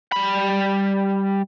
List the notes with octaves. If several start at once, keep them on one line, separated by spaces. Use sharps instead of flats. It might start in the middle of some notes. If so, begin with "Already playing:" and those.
G3 B5